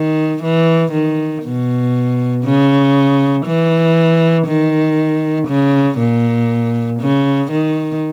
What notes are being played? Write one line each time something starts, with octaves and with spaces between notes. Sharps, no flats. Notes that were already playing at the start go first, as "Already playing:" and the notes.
Already playing: D#3
E3
D#3
B2
C#3
E3
D#3
C#3
A#2
C#3
D#3